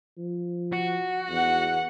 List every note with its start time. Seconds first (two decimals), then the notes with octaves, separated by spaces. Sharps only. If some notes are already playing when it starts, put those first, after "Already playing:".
0.18 F3
0.73 F#4
1.30 E2 F#5